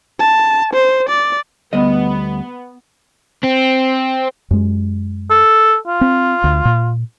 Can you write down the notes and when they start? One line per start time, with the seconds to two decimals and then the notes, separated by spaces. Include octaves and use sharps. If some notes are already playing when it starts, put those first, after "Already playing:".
0.20 A5
0.73 C5
1.08 D5
1.73 D2 G3 B3 D#5
3.44 C4
4.51 F#2 G#3
5.30 A4
5.87 F4
6.01 C4
6.44 D2
6.65 A#2